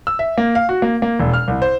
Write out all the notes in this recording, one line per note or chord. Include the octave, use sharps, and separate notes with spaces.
E6
E5
A#3
F5
F#4
A#3
A#3
E1
F6
C2
C5